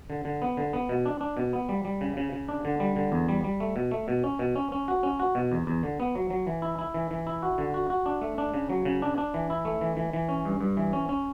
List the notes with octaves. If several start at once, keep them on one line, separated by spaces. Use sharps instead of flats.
D3
D3
B3
D3
B3
B2
D4
D4
B2
B3
G3
G3
C#3
C#3
C#3
D4
D3
G3
D3
E2
G3
G3
A3
B2
A3
B2
C#4
B2
C#4
C#4
F#4
C#4
F#4
B2
E2
E2
D3
B3
F#3
F#3
E3
E4
E4
E3
E3
E4
F#4
D3
F#4
F#4
D4
A3
D4
C#3
F#3
C#3
D4
D4
E3
E4
A3
E3
E3
E3
C#4
G2
G2
E3
C#4
C#4